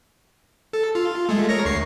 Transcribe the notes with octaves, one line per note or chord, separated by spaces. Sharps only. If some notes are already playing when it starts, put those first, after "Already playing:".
A4
F4
G#3 A3
A#4 C#5 A#6
D2 C#6 C7